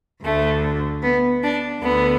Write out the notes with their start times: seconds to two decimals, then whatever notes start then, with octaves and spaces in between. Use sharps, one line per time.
0.24 D2 D3 A3
1.03 B3
1.43 D4
1.82 D2 D3 B3